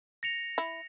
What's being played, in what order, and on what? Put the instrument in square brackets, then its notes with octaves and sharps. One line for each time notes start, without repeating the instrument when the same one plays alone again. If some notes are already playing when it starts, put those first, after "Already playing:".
[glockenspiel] A#6 C#7 F7
[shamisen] E4